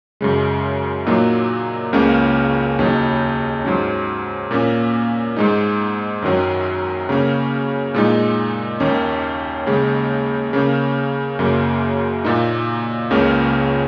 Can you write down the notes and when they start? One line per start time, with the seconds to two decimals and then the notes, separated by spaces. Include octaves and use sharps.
0.21 F#2 C#3 G#3
1.06 A#2 F#3 A#3 D#4
1.93 C#2 C#3 A#3 C#4
2.79 D#2 C#3 F#3 D#4
3.65 G#2 F#3 C#4
4.51 A#2 A#3 C#4
5.36 G#2 G#3 D#4
6.22 F#2 D#3 F#3 C#4
7.09 C#3 A#3 C#4
7.94 A#2 G#3 D#4
8.80 D#2 D#3 A#3 C#4
9.66 D#2 C#3 G#3
10.53 C#3 A#3 C#4
11.39 F#2 C#3 A#3
12.24 A#2 A#3 D#4
13.11 C#2 C#3 A#3 C#4